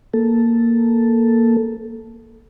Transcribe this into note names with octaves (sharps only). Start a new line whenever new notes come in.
A#3 A4